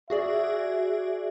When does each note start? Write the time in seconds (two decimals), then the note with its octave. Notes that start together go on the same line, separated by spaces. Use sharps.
0.10 F#4 G#4 D5 E5